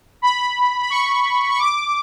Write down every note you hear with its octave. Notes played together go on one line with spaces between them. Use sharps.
B5
B5
C#6
C#6
D6